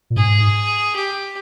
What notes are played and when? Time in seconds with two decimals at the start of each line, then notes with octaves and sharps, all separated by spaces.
0.10 A#2
0.16 G#2 G#4
0.95 G4